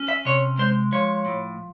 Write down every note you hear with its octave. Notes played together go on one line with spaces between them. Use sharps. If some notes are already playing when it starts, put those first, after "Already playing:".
Already playing: C#4
E5
C3 C#5
G#3 C5
F3 C#5
A2